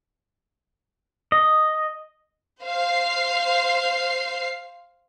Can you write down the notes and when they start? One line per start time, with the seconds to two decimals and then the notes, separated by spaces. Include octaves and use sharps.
1.32 D#5
2.64 C5 F5 C7